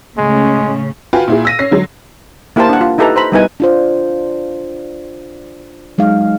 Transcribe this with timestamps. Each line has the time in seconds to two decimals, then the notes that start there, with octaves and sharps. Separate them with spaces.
0.18 A2 C#3 G#3 C#4
1.13 F4 F#4 B4 G5 G#5
1.28 A#2 E4 G#4
1.45 E6 A#6 D#7
1.59 C#4 C#5 A#6 C7
1.71 D3 F#3 G#3
2.56 A#3 E4 G4 A#4 C5 A5
2.69 D4 F#5
2.81 F4
2.98 D#4 E4 G4 A4 B4 A#5
3.16 C5 A#5 B5
3.32 G3 B3 D#4 E4 B4 G#5
3.60 D4 F4 C5
5.98 F#3 G#3 D#4 F5